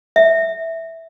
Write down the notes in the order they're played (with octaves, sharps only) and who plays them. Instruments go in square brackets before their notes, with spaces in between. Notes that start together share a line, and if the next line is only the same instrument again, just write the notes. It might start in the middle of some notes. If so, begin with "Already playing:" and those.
[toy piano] E5